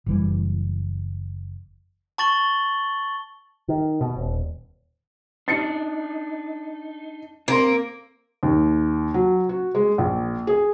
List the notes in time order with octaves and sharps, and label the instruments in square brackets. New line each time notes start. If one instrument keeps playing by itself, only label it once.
[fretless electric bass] F#1 E3 G3
[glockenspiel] A5 C#6 A6 F#7 G7
[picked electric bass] D#3
B2
D#1
[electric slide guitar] D4 D#4 [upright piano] A6 C7 C#7
[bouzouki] A#3 [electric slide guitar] C4 [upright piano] A#5 C6
[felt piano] D#2
F#3
F#4
G#3
A#1
G#4